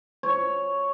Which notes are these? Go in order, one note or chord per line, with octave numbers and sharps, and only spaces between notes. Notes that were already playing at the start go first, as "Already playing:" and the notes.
C#5